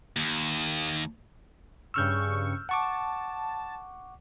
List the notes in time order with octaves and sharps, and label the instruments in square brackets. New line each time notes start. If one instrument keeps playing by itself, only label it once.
[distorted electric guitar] D#2
[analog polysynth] G2 C#3 C#6 [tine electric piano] E6 F6 G6
[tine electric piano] F#5 C#6 D6 [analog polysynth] A5